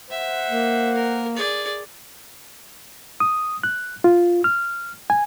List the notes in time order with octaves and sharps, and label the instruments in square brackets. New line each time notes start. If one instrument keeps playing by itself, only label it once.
[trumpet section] C5 F#5 [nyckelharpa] E5
[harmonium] A#3
[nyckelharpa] A#4
G#4 D5
[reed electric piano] D#6
F#6
F4
F6
G#5